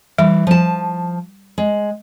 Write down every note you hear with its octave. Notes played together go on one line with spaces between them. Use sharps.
E3 G3
F3 A5
G#3